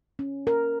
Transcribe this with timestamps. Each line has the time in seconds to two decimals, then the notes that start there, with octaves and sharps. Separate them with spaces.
0.19 C#4
0.47 A#4